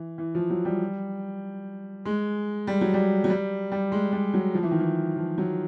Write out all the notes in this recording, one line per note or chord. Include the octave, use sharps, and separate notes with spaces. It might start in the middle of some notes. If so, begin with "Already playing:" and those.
Already playing: E3
E3
F3
F#3
G3
G#3
G3
F#3
G3
F#3
G3
G3
G#3
G3
F#3
F3
E3
D#3
E3
F3
F#3